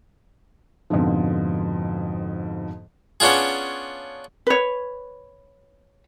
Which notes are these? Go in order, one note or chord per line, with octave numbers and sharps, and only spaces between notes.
F2 G#2 B2 D3 F3
B3 C#4 D4 F4 G#4
B4 C#5